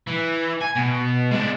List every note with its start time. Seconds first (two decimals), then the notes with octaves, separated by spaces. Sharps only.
0.08 E3
0.61 G#5
0.76 B2
1.31 G#3 D4